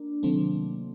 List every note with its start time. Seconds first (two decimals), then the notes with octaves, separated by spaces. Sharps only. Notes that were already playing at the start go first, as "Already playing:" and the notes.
Already playing: A#3 D4
0.23 C3 D#3 F#3 A3 C4